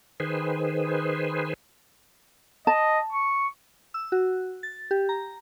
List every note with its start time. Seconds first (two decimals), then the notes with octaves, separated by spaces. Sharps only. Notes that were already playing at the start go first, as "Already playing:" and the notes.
0.20 D#3 G#4 B4 C5
2.67 D#5 A5
3.12 C#6
3.94 E6
4.12 F#4
4.63 A6
4.91 G4
5.09 A#5